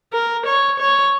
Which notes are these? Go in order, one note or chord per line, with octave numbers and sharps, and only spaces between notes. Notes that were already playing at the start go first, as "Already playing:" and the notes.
A#4
C#5
C#5